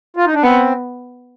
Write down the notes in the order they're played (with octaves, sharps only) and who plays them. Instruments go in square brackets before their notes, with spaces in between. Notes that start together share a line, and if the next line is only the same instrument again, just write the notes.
[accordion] F4
D#4
D4
[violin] B3 [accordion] C4